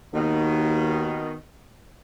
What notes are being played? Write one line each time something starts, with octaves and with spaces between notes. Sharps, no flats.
D#2 B2 D#3